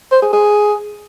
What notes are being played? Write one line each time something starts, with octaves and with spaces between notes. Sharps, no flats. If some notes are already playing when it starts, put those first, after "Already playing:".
C5
G#4
G#4